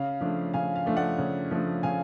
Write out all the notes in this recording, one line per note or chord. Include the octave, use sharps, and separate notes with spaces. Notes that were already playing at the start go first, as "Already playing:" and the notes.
Already playing: C#3 F5
F3 A3 D4
C#3 F5 G#5
F5
F3 A3 D4
D5 F#5
C#3
F3 A3 D4
C#3 F5 G#5